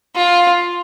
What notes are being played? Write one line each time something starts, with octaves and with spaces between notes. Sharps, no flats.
F4